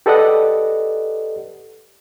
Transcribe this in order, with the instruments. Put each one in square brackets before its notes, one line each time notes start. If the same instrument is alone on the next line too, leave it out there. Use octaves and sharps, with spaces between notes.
[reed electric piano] G4 A4 B4 D5 D#5 F#5